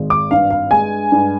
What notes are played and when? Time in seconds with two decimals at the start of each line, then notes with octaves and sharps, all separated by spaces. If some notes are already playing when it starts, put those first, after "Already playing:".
Already playing: G#1 G#3
0.10 D6
0.31 G2 F5
0.50 F5
0.71 G#3 G#5
1.12 G2